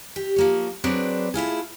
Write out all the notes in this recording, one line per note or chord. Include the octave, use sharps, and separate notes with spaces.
G4
F3 A#3 C#5
F#3 C4 D4 G#4 B4 D5
A3 E4 F4 G#4